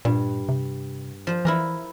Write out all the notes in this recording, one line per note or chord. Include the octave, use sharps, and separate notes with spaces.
G2 A#2
C3
F3 C5
E3 E4 A#4 A#5